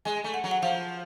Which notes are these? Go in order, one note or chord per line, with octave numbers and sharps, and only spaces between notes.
G#3 G#5
A3
F#5
F#3
F#5
F3 F5